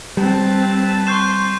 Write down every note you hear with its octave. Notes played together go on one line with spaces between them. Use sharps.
G3 C4 B4 A5
C6 C#6 G6 E7